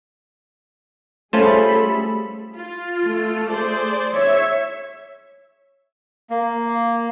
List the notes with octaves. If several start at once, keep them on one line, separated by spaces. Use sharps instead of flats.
G3 A3 C#4 F4 G#4 A4 C5 B5
F4
A3
G#4 C5 D5
C#5 E5
A#3